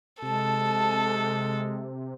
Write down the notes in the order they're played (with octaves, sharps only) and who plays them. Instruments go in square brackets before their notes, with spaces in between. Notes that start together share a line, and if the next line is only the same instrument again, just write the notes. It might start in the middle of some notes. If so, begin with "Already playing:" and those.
[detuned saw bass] C3 [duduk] G#3 [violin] A4 [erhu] A5